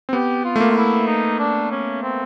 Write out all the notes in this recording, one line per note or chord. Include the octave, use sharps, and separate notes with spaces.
C4
B3 G4
F4
A3
A#3
F4
E4
D#4
D4
C#4
C4